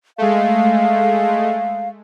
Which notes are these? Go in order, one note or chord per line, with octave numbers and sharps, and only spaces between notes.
G#3 A3 F5